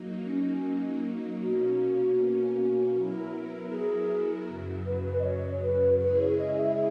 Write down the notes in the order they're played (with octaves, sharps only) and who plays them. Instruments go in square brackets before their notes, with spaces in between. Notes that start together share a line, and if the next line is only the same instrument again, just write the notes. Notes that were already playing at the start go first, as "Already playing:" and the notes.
Already playing: [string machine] F#3 A#3 D#4
[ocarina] C#4
[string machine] B2 A#3 C#4 [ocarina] F#4
[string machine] F#3 B3 E4 A#4
[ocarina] G#4
[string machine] F#2 C#3 F#3
[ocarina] B4
D#5
C#5
B4
[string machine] C#3 G#3 C#4 E4 G#4 [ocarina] B4
[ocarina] C#5
D#5
E5